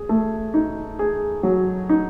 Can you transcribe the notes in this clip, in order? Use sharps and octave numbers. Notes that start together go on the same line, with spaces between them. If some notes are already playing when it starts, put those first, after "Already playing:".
Already playing: G#4
A3
D#4
G#4
F#3
D#4